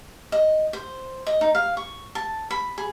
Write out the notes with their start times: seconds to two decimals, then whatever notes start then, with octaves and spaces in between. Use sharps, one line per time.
0.32 D#5
0.73 C5
1.27 D#5
1.41 D#4
1.55 F5
1.77 C#6
2.15 A5
2.51 B5
2.78 G#4